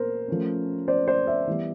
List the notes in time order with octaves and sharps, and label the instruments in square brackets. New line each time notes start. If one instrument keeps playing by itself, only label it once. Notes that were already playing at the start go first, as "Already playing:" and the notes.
Already playing: [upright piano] A#2 B3 A#4 C5
F3 A3 C#4
C5 D5
C5 D5
D5 E5
E3 G3 B3